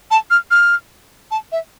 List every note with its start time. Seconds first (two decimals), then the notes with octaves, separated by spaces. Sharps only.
0.11 A5
0.30 F6
0.51 F6
1.31 A5
1.52 E5